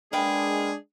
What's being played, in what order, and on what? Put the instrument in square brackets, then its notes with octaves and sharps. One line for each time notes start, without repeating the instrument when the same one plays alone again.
[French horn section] G#3 D4 [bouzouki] A#3 B4 G5 [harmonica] G#4